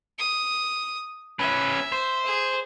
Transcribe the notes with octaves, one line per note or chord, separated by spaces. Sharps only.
D#6
C#4 B4 E5
C5
G#4